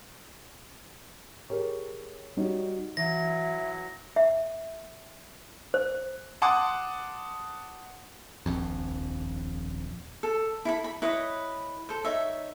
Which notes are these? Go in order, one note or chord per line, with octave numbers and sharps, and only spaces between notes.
G4 G#4 A#4 C#5
G3 D#4 F#4 C#5
E3 F#3 E5 A#6
E5
C5
F#5 A5 C6 D6 D#6 F#6
D#1 A#1 F2
A4
E4 A4 B5
B5
E4 B4 C#5 D#5
A4 C5
D#4 C#5 E5